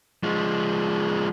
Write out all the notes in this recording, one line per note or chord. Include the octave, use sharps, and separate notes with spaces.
F3 G#3